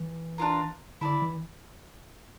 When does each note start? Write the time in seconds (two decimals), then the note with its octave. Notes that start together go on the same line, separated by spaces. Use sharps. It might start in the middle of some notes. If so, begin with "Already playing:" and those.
Already playing: E3
0.38 D4 F4 A#4
1.01 D3 E4 A4 D5
1.22 E3